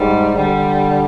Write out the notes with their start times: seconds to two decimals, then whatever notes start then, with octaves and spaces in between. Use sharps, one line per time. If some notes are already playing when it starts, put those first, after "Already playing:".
Already playing: G#2 G3
0.36 D3 G3